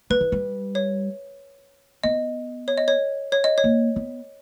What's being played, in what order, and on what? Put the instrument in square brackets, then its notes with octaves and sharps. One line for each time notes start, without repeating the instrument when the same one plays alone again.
[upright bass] G3 [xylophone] B4
[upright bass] E3
G3
[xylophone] C#5
[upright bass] B3 [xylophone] D#5
[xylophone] C#5
D#5
C#5
C#5
D#5
C#5
[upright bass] A#3
B3